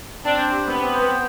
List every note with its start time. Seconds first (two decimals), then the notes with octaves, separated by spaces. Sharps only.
0.24 C4 D4
0.38 C5
0.52 G4
0.66 B3 C4
0.80 C4
0.94 C5
1.08 G5